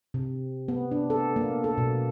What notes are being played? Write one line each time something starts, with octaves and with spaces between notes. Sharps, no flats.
C3
B3
D4
A4
A#3
A4
B2